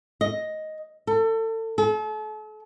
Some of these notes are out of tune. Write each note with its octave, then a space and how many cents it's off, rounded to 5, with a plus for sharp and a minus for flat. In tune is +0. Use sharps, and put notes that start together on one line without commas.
D#5 +5
A4 +30
A4 -40